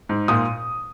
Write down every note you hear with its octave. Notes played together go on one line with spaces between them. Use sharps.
G#2
A#2 D#6